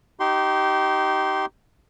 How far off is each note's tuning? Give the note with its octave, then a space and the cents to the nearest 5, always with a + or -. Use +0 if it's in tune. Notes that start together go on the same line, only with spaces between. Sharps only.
D#4 +0 G4 -25 C6 +0